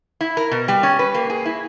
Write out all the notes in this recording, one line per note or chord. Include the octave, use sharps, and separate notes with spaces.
E4
A#4
B2
G3
C#4
B4
A#3
G#4
E4